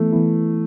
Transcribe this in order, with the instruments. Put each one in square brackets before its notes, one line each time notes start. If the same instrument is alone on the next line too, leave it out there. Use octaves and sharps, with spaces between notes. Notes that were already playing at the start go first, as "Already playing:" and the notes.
Already playing: [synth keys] E3 B3 E4 [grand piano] A3
[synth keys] E3 B3 E4